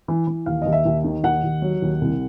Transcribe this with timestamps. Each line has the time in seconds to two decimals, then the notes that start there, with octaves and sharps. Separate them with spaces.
0.08 E3
0.27 E3
0.46 D#2 F5
0.62 D#2 D#5
0.73 E5
0.85 D#2
1.04 D#3
1.24 D#2 F#5
1.44 D#2
1.62 F#3
1.82 D#2
2.01 C2